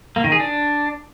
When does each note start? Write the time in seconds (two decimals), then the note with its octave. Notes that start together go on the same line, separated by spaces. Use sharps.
0.16 A#3
0.24 D#3
0.32 G#4
0.40 D4